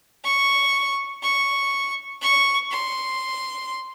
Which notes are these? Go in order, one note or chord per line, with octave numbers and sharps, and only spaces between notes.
C#6
C#6
C#6
C6